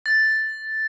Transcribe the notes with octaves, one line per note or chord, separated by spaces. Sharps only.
A6